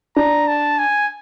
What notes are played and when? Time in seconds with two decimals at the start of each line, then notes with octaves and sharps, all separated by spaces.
0.16 D4 A#5
0.48 A5
0.78 G#5